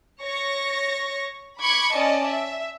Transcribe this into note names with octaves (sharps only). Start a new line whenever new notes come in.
C#5 C#6 A#6
B5 C#6 D6 G#6 C#7
C#4 D5 D#5 A5
E5